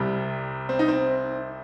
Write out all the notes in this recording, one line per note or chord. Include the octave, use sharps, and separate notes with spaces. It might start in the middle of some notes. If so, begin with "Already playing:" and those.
Already playing: C2 C3 G3
C4
D#4
C4